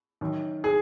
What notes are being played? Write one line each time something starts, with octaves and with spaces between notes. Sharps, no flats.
F#2 D#3
G#4